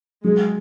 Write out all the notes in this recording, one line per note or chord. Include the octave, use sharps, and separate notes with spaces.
F#3 G#3